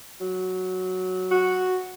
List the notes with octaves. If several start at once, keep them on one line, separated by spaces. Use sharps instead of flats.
F#3
F#4